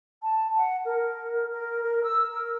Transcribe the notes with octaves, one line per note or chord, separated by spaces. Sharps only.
A5
F#5
A#4
A#4
A#4
E6
A#4